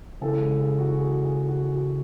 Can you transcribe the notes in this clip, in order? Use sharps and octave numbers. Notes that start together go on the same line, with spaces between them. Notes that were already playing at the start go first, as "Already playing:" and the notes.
C#3 E3 G#3 A4
G#4
G#4
F#4
G#4
G#4
F#4
F#4